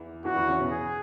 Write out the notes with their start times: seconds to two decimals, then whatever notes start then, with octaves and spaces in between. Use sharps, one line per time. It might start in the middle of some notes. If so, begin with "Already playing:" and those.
Already playing: E2 E3
0.25 E2 E3 F#4
0.36 E2 E3
0.47 C#3 C#4
0.59 B2 B3
0.71 G#4